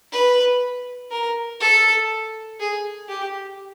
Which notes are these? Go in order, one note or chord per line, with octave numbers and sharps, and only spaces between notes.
B4
A#4
A4
G#4
G4